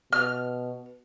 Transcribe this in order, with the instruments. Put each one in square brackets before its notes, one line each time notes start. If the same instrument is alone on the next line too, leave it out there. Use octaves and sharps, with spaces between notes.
[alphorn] B2 [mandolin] F6